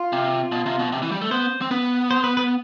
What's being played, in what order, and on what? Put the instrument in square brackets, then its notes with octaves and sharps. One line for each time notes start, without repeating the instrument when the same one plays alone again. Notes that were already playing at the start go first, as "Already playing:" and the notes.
Already playing: [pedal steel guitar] F4
[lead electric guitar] C3
B2
C3
B2
C3
E3
G3
A3
[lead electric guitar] B3 [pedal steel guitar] C5
[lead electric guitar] C4
[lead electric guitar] B3 [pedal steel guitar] B4
[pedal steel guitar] C5
B4
B4